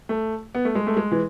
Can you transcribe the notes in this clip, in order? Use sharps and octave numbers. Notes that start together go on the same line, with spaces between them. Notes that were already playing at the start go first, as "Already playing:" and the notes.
A3
B3
A3
G#3
A3
G#3
E3